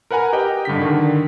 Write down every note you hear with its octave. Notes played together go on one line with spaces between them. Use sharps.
A#4 B4 F#5 G#5 A#5
G4 D#5 G5
G2 D3 B6
D3 D#3